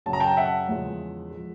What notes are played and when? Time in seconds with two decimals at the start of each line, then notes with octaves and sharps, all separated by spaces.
0.06 F#2 C#3 F#3 A5
0.13 A#5
0.20 G5 A5
0.37 E5 F#5
0.69 E2 C#3 F3 G#3
1.31 F3 G#3